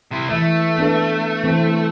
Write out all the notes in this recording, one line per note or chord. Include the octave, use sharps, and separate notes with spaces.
C3 E4
E3 A3 E5
B3 D4 A4
E3 C4